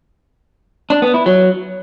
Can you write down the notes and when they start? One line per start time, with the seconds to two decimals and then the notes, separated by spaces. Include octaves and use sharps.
0.90 D4
1.02 B3
1.14 E4
1.26 F#3